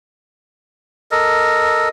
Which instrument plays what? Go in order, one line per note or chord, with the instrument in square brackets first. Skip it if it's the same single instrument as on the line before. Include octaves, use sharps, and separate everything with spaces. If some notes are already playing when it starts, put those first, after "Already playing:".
[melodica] A4 A#4 D#5